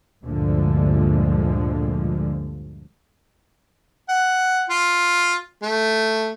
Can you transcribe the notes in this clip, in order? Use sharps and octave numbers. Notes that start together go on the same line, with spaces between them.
D2 G2 A#2 D3 F3 G#3
F#5
F4
A3